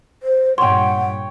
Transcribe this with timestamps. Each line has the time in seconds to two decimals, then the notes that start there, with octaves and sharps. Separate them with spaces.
0.23 C5
0.58 G2 A#2 C#5 F#5 G5 C6